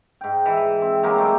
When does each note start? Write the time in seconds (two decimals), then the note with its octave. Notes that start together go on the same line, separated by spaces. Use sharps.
0.21 G#2 G5
0.46 E3
0.82 C4
1.03 F#3 G#3 A#3 G4
1.18 A3